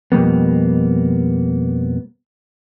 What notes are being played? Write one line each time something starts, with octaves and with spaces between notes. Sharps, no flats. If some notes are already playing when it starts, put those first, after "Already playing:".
F2 B2 G3 A#3 B3